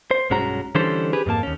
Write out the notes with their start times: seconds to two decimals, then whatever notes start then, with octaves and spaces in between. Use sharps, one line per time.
0.11 C5
0.30 B1 G2 G#3 C#4 F#4 A#5
0.75 D3 E3 G3 C#4 A4 C5
1.13 G4 G#4 B4
1.26 F2 G#2 A#3 A5
1.43 D#2 C#4